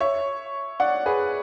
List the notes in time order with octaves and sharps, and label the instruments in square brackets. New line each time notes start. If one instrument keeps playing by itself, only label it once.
[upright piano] C#5 E5
D5 F#5
G#4 B4